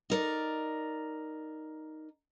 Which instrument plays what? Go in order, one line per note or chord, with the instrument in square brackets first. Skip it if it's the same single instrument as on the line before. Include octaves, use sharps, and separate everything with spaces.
[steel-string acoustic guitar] D#4 A#4 D5